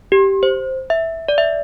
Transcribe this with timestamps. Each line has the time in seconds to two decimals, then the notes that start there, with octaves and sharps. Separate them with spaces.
0.12 G4
0.43 C5
0.90 E5
1.29 D5
1.38 E5